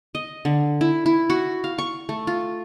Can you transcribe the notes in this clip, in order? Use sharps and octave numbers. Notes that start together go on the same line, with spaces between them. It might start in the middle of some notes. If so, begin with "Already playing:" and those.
D#5
D3
E4
E4
F#4
F5
C#6
A3
F4